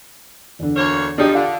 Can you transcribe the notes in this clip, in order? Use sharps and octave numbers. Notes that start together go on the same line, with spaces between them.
E2 D3
D2 A#3 C#5
F3 D4 D#4 G4
D3 F4 F5